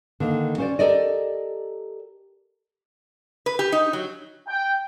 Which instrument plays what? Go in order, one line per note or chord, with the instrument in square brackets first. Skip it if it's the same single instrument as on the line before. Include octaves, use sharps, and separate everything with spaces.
[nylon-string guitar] D3 D#3 A#3
C#4 C5 D5
G4 A4 A#4 D5 D#5
[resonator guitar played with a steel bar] B4
G4
D#4
F#3
[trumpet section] G5